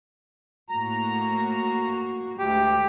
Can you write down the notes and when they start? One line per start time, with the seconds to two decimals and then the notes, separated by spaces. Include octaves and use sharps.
0.69 A2 A#3 F#4 A#5
2.39 D2 G#3 A3 G4